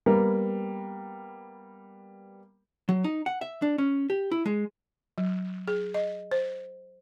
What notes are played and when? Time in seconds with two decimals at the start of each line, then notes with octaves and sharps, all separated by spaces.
0.06 G3 A#3 B3 A#4
2.89 F#3
3.04 D#4
3.26 F#5
3.41 E5
3.62 D4
3.78 C#4
4.10 G4
4.31 E4
4.46 G#3
5.18 F#3
5.68 G#4
5.94 D#5
6.31 C5